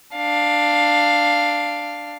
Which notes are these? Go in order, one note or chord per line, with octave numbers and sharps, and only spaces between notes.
D4 F5